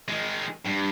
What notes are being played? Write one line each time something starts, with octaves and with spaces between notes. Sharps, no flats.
D#3 G#3
G2